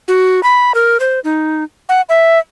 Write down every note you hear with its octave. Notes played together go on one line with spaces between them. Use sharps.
F#4
B5
A#4
C5
D#4
F#5
E5